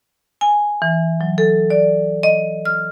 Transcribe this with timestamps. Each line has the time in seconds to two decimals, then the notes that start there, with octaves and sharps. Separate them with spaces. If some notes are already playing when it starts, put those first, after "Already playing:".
0.41 G#5
0.82 E3
1.21 F#3
1.38 A4
1.70 D5
2.23 D#5
2.65 F6